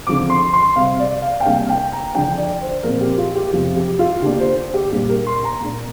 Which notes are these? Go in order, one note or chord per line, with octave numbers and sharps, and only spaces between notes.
D3 F3 C4 D6
C6
C6
C3 G3 C4 F5
D5
F5
G5
C3 G3 A#3 D4 F5
G5
A#5
D3 F3 D4 G5
D5
C5
A#2 F3 C4 A#4
G4
F4
G4
F2 C3 F3
G4
F4
D3 A#3 D4 G4
C5
G4
A#2 G3 D4 G4
A#4
C6
A#5
A#2 A#3 D4